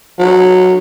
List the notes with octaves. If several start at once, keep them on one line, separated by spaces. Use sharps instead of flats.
F#3